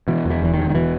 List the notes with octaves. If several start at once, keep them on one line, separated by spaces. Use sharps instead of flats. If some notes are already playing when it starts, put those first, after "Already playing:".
B2 E3
E2
E3
E1 E3
E1 D#3
D#3
B2 E3